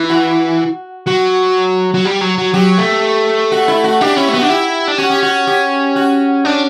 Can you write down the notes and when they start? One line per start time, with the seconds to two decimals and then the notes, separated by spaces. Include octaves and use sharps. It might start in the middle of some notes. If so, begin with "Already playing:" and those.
Already playing: E3
0.09 F#4
1.07 F#3 F#4
1.94 F#3
2.05 G3
2.21 F#3
2.38 F#3
2.54 F#3 G4
2.78 A3
3.52 F#4
3.68 E4
3.84 F#4
4.01 D4 G4
4.16 C#4 E4
4.29 A3
4.33 B3 F#4
4.42 D4
4.49 E4 G4
4.88 D4
4.98 C#4 F#4
5.10 G4
5.23 F#4
5.47 G4
5.96 F#4
6.45 C#4 D4